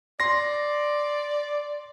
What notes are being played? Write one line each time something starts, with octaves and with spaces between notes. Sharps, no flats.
D5 C6 A#6